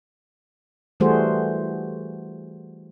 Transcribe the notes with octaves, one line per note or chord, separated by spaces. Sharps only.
E3 G3 A3 F#4 G#4 C5